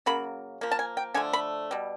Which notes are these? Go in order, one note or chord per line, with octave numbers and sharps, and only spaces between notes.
C#3 F#3 A#3 B5
F3 A#3
A5
G#5
G5
D3 F3 A3 G#5
B5
B2 G3